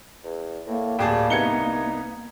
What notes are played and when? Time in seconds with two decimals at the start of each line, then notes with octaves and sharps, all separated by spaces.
0.24 E2
0.67 A2 A#3
0.99 D1 G3 G#4 G5 A5
1.30 C2 G3 B3 D#4 G#6 C#7 G7